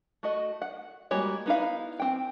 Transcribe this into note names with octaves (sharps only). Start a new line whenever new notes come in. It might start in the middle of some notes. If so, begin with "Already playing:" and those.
A3 F#4 D#5
F#5
G3 G#3 A#3 F#4 C#5
B3 D#4 E4 F5
C4 G5